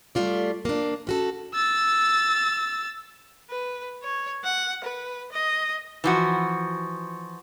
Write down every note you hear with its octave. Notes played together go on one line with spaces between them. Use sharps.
G3 A3 F4 D5
A#3 D4
C#4 F#4 A4
E6 A6
B4
C#5
F#5
B4
D#5
E3 F3 F#4